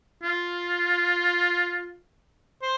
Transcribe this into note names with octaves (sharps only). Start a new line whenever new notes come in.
F4
C5